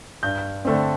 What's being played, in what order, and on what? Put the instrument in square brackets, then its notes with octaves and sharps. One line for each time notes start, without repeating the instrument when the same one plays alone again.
[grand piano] G2 G6
D3 A3 C4